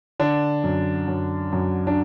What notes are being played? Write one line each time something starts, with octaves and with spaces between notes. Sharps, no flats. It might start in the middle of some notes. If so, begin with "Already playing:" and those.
D3 D4
F#2
F#2
F#2
D4